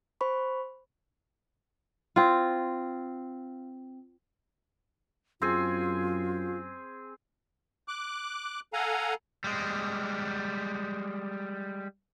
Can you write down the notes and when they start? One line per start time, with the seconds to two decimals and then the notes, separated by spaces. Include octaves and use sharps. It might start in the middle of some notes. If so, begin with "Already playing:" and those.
0.21 C5 B5 C#6
2.16 C4 F4
5.42 F#2 C4 F4 G#4 G#5
7.88 D6 F#6
8.73 A4 F5 F#5 G#5 A#5
9.44 G3 G#3